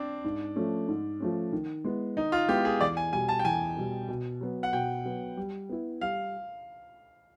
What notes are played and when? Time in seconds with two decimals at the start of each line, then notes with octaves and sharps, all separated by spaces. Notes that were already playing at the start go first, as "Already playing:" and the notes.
Already playing: C4 D4
0.24 G#2
0.56 F3 A3 C#4
0.88 G#2
1.20 F3 A3 C#4
1.52 D#3
1.84 G#3 B3 E4
2.17 D#3 D#4
2.32 F4
2.49 G#3 B3 E4 G4
2.65 G#4
2.81 E2 D5
2.97 G#5
3.13 B2 G3 G#5
3.29 A5
3.39 G5
3.45 E2 G#5
3.76 B2 G3
4.08 B2
4.41 F#3 B3
4.63 F#5
4.73 B2 G5
5.05 F#3 B3
5.37 G3
5.69 B3 E4
6.01 G3 F5